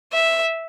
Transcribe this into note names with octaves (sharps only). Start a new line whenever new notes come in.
E5